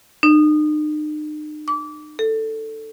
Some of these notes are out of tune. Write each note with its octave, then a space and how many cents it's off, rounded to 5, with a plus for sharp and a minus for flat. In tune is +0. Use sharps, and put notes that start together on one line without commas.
D#4 -45
D6 -25
A4 +10